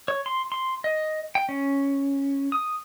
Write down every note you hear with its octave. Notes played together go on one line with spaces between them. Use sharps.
C#5
C6
C6
D#5
G5
C#4
D#6